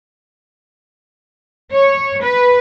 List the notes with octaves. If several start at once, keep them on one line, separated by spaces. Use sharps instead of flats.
C#5
B4